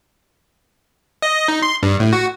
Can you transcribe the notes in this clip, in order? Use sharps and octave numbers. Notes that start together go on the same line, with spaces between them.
D#5
D#4
C6
G2
A2
F#4